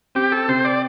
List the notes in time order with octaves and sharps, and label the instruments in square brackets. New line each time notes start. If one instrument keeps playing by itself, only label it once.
[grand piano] C4 [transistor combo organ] G4
[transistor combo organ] A4
[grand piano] C3 [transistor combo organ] C5
[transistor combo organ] D5